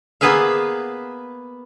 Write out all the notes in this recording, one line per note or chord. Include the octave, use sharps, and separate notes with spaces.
A#3 B3 G#4 B4 E5 F5